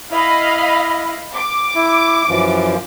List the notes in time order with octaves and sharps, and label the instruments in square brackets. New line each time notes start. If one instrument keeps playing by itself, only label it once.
[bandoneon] E4 [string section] D#5 F5 B5
[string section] D6
[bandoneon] E4
F#2 E3 F3